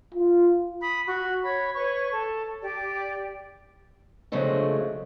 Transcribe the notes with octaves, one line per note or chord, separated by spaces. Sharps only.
F4
B5 D#6
F#4
C#5 B5
B4 C#5 C#6
A4
G4 D5
C#3 F3 F#3 G#3 A3 D4